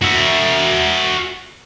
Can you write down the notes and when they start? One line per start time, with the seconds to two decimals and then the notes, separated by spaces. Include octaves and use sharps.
0.02 F#4 E5